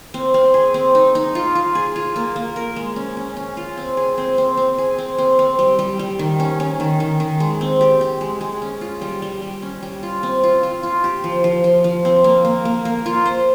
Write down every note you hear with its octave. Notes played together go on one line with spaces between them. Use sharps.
C4
C4
G#4
C4
D#4
D#4
F4
F4
G#4
F4
A#3
A#3
A#4
G#3
C#4
C#4
C#4
F4
C4
G#4
C4
C4
C4
G#4
C4
C4
C4
G3
G3
G3
D#3
C#4
C#4
D#3
D#3
D#3
G#3
C4
G4
G4
G#3
G#3
C#4
F4
G3
G3
G3
C#4
G3
F4
C4
F4
F4
F4
G4
F3
F3
F3
F3
C4
A#3
A#3
A#3
A#3
F4
C5